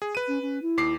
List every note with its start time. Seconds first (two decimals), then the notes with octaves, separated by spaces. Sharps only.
0.02 G#4
0.15 B4 D#7
0.28 C#4
0.42 C#4
0.62 E4
0.77 D#2 D6 C7